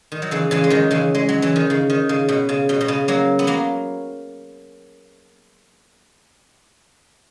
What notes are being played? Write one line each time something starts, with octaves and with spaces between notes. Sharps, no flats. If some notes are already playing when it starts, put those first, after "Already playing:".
D#3
F#3
C#3 E3
C#3 E3
G#3
D#3 F#3
C#3 E3
G#3
F#3
E3
D#3
C#3
D#3
C#3
B2
C#3
B2
B2
C#3
F#3 A#3
B3
F#3 A#3